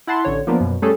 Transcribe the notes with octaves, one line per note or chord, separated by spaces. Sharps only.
E4 F#5 A5 C6
A1 D3 C#5
F3 A#3 B3 D4
F#2 B2
G3 A3 C#4 G#4 A4